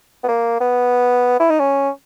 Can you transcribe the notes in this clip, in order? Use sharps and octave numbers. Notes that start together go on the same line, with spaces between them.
B3
A#3
B3
E4
D#4
C#4